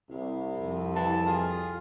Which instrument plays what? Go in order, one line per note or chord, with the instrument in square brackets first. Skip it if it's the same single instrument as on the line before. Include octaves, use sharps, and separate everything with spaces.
[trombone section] C2 [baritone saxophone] C3
[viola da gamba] F2
[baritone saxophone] E3 [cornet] A5
[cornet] F4 [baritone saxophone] G#4